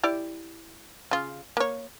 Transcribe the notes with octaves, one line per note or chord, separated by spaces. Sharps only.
E4 G4 D5
C#3 F4
A#3 C#5